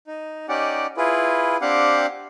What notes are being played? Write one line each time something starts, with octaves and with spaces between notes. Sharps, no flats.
D#4
C#4 D#4 G4 D5 F#5
E4 F4 G#4 B4
C4 D4 G4 F5 F#5